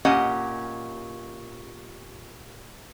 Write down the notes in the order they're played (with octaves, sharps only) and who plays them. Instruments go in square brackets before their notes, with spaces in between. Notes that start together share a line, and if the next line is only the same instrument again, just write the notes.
[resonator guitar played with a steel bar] A#2 C#4 G4 D#5 F#5